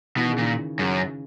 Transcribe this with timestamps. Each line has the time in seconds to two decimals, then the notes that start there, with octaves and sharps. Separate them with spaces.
0.17 B2 E3
0.24 D#3
0.32 C#3
0.38 A#2 D#3
0.79 F#2 C#3